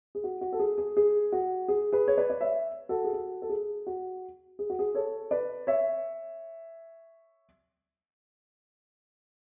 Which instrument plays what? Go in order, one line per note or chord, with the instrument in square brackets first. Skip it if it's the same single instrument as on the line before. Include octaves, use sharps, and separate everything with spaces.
[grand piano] G#4
F#4
F#4
A4
G#4
G#4
G#4
F#4
G#4
G#4 B4
C#5
B4 D5
D5
C#5 E5
F#4 A4
G#4
F#4
A4
G#4
F#4
G#4
F#4
G#4
A4 C#5
B4 D5
C#5 E5